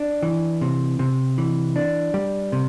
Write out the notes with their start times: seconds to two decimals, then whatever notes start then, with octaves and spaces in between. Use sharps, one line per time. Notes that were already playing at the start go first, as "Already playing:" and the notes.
Already playing: D4
0.23 E3
0.61 C3
0.99 C3
1.38 E3
1.76 D4
2.14 G3
2.52 C3